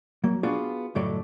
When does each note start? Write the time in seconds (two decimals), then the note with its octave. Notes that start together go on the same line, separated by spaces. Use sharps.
0.24 F#3 A#3
0.43 B3 D4 F4 F#4 G#4
0.95 C#2 F#2 A2 F#3 A3 D5